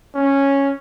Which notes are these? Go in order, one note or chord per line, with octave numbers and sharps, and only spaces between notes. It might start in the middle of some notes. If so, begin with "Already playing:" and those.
C#4